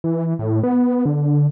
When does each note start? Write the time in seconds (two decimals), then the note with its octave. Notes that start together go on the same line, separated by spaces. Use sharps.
0.04 E3
0.39 A2
0.63 B3
1.06 D3